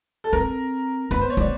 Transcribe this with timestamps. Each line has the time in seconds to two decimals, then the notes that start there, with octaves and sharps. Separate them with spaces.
0.24 A4
0.33 C4 A#4
1.11 B3 B4
1.21 C5
1.30 C#5
1.37 B3 D5